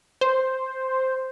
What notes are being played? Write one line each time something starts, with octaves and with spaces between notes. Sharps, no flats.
C5